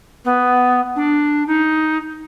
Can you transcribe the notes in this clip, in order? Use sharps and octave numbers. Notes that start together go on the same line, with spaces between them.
B3
D4
D#4